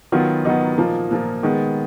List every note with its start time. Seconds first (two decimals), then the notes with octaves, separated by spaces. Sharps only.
0.12 D#3 F#3 B3 F4
0.45 D#3 F#3 B3 D#4
0.78 A#2 F3 A#3
1.11 A#2 F3 A#3
1.43 D#3 G#3 B3